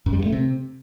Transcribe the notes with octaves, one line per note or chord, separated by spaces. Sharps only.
F#2
G3
G2
A3
C3